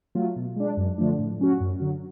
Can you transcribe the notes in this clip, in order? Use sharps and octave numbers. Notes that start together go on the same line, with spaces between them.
F#3 A3 F4
B2
G#3 D4
F#2
D3 F3 A3 D4
A2
F#3 C#4 F#4
F#2
D3 F#3